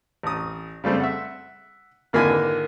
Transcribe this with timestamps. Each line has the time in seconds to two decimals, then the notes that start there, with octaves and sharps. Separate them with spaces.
0.23 A1 D#6
0.84 C#3 G3 A3 C4
1.00 E5 F#5
2.13 G#1 D3 A#3 E4 B4 G#5